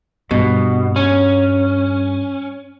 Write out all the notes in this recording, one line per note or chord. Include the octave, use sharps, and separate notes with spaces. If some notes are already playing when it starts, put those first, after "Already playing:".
G2 B2
C#4